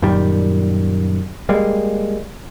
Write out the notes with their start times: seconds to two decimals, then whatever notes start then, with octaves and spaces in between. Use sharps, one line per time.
0.02 F#2 A#2 D#3 G3
1.49 G3 G#3 A#3